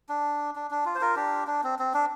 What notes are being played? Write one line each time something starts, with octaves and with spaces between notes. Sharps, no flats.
D4
D4
D4
F4
C5
F4 A#4
D4 G4
D4
C4
C4
D4